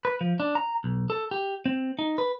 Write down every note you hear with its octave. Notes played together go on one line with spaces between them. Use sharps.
B4
F3
D4
A#5
B1
A4
G4
C4
D#4
B4